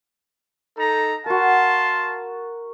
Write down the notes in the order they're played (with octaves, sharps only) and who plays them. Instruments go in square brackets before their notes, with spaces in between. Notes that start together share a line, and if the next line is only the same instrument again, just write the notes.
[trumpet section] D#4 A4 A#5
[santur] F#4 A#4 [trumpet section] F5 A5 C6